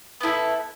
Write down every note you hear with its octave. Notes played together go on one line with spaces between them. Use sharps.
B3 E4 A4